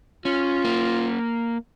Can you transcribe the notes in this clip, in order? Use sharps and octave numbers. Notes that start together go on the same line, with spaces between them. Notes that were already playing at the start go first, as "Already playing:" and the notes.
C#4 F4
A#3